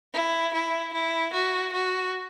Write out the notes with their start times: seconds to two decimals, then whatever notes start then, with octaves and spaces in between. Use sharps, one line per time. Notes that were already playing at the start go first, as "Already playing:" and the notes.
0.13 E4
0.53 E4
0.93 E4
1.33 F#4
1.73 F#4